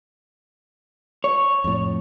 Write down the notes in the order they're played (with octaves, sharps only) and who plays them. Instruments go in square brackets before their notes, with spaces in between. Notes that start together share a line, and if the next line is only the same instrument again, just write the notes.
[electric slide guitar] C#5
[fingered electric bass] F2 A2